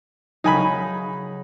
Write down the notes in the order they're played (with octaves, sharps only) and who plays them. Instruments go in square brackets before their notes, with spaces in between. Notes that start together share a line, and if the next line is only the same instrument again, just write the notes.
[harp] C#3 F#3 [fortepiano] D#4 G#5 B5